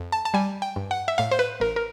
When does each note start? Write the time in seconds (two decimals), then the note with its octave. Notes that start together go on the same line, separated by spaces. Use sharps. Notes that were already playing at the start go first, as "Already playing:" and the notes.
Already playing: F2
0.12 A5
0.25 A5
0.34 G3 G#5
0.62 G5
0.76 G2
0.91 F#5
1.08 E5
1.18 A2 F5
1.31 C5
1.39 B4
1.60 A1 A#4
1.76 A#4